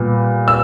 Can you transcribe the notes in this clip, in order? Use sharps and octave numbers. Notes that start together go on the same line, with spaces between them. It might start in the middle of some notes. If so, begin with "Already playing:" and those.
Already playing: A#2 G3 B3
E6